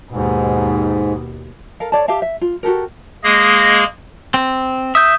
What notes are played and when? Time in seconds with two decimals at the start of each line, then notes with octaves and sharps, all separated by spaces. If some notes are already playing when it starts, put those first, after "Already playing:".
0.11 D#2 G#2 B2
1.80 A4 A#4 F5
1.92 A4 C#5 D5 A5
2.08 G4 E5 F5 A5
2.22 E5
2.41 F4
2.63 F#4 G4 A4 A#4
3.24 G#3 A#3 G#4 D#5
4.34 C4
4.95 E5 D#6 G6